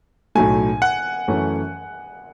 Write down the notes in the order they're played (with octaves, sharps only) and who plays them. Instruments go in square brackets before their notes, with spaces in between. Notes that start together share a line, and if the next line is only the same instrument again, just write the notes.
[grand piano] B1 A2 F#3 A3 [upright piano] G#5
[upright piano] F#5
[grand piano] F#2 E3 A3 C#4